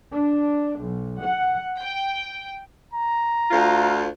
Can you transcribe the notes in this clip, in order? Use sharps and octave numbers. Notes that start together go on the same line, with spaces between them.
D4
B1
F#5
G5
A#5
D2 F4